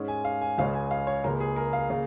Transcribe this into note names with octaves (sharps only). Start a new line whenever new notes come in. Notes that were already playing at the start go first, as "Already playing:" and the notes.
Already playing: G#2 G#3 C#4
G#5
F5
G#5
C#2 C#3 G#3 C#4 F5
G#5
F5
C#5
C#2 C#3 A#3 A#4
G#4
A#4
F5
C#3 A#3